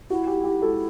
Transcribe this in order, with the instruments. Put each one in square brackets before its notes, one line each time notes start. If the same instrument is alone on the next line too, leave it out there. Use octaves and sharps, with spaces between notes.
[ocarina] E4 [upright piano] F#4
[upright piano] G4
G4
F#4 A4